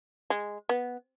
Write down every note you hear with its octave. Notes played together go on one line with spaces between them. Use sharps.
G#3
B3